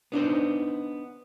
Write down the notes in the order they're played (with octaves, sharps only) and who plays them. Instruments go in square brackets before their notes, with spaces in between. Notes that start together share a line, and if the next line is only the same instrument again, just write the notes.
[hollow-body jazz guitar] B3 D4 D#4 C5